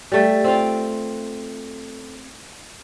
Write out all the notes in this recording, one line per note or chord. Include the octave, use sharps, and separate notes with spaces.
G3 A3
C4 F4